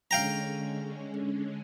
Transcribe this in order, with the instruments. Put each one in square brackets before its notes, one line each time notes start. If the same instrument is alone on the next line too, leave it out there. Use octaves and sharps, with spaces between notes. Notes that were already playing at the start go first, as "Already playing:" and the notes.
[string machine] D3 G#3 C#4 [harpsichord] F5 G5 A#5